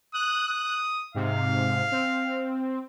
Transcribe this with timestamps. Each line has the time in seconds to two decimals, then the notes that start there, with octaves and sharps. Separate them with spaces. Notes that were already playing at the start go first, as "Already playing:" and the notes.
0.14 D#6 F#6
0.48 D#6
1.15 G#2 C3 F5
1.92 C4